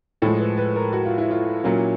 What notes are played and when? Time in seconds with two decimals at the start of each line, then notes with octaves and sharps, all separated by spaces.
0.22 A2 F3 G#3 A4
0.40 B4
0.57 B4
0.76 A#4
0.93 F#4
1.05 F4
1.18 E4
1.31 F4
1.64 A#2 F#3 A#3 C#4 E4